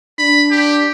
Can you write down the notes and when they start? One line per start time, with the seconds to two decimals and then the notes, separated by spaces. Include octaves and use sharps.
0.19 D4 B5
0.51 G4